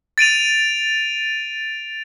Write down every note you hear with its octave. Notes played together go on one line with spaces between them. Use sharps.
A6 D7 D#7 F7